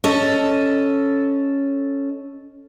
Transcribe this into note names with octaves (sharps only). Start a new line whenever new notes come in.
C#4 A4 D#5